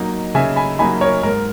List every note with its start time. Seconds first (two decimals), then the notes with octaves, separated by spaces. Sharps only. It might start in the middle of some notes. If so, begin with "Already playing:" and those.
Already playing: F#3 A#3 D#4
0.35 C#3 E5 G#5
0.56 G#5 B5
0.79 F#3 A#3 D#4 G#5 B5
1.01 A#4 C#5
1.23 G#2 A#4